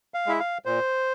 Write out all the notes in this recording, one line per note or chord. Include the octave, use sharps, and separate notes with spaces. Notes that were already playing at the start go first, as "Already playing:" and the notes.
F5
G#3 E4 E5
F5
A#2 C5